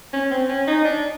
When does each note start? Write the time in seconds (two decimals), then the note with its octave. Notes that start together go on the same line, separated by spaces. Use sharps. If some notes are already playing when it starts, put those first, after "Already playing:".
0.13 C#4
0.31 C4
0.49 C#4
0.67 D#4
0.85 D4